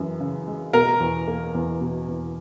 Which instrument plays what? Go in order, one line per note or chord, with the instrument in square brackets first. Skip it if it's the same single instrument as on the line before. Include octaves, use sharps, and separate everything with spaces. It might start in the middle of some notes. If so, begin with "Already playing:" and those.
Already playing: [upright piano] F#2 E3
C#3
G#3
[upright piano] B2 [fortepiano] A#4
[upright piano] E2
A#3
E2
B2
E2